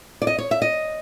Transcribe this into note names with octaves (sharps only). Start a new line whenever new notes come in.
D5
D#5
C#5
E5
D#5